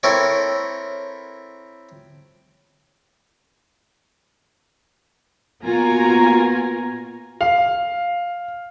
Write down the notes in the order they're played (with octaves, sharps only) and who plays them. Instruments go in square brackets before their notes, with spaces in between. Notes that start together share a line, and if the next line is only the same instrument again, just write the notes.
[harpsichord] C4 E4 A4 A#4 C#5
[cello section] A#2 F4 F#4 [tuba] B3 [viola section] A#4 G#5 A#5
[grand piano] F5